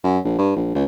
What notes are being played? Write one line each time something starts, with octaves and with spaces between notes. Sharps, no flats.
F#2
A#1
G2
A#1
C#2